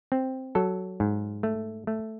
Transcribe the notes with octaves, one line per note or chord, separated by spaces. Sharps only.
C4
F#3 A4
G#2
A3
A3